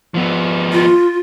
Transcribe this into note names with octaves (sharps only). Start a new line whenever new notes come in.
F3 B3
F4